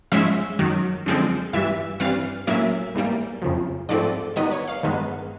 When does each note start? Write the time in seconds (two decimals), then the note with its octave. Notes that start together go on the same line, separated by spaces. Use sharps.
0.12 G#2 F3 G#3 C#4 E5
0.59 F#2 D#3 F#3
1.06 F#2 D3 F3 G#3 C4
1.53 G2 E3 G3 E5
2.00 G2 E3 G3 C4 F5
2.47 A2 F#3 A#3 C#4 E5
2.95 G#2 E3 G3 A#3
3.42 F2 C#3 F3
3.89 G#2 F3 A3 C4 D5
4.36 D#3 G3 B3 D#4 D#5
4.51 C#5
4.67 F5
4.83 G2 D#3 G#3 B3